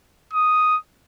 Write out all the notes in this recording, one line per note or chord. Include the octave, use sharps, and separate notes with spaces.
D#6